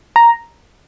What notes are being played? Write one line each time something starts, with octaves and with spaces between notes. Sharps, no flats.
A#5